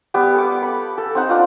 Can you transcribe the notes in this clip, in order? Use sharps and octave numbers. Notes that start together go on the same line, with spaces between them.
G3 B3 G4
A4 D6
B5
A4
C4 D#4 F#5
D4 F4